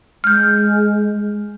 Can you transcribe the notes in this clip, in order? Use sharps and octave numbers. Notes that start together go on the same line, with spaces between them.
G#3 F6 G6